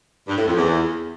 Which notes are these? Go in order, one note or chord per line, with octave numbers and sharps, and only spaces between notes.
G2
A2
F2
E2